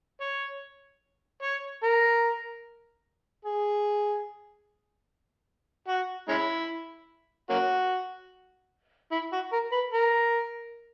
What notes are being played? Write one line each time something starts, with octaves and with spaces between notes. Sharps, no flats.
C#5
C#5
A#4
G#4
F#4
G#3 C#4 E4
A#3 C#4 F#4
E4
F#4
A#4
B4
A#4